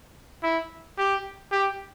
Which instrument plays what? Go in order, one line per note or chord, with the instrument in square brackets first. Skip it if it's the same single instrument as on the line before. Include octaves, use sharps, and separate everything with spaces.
[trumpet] E4
G4
G4